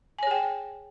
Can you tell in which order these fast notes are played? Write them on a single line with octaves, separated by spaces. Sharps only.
G#5 C#5 G#4 G5